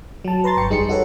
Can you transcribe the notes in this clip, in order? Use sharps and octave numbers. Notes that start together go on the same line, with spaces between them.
F#3 A5
B4 A#5 C6 A6
G1 G2 G5 C#6 C#7
F2 G3 D#4 G#4 C6 C#7
D#4 F#4 G4 A4 B4 C#5